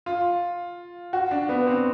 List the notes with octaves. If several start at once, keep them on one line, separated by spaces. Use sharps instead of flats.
F4
F#4
D4
B3
C4